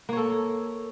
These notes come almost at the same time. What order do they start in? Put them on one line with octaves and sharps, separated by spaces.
A#3 C#5 A4